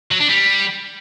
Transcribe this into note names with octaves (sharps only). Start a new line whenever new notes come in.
F#3
D4
G3